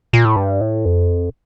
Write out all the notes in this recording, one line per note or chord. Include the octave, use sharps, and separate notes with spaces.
A#2
A2
G2
A2
F2